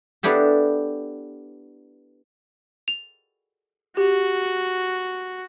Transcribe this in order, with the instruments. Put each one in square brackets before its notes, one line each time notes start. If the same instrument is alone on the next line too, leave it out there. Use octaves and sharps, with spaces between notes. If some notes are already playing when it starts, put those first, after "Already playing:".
[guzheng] B3 D4 E4 G4 A4
[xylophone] F7
[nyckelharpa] F#4 [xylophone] G4